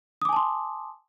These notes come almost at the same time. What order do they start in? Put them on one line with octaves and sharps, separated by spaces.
D#6 D6 G#5 A5 C6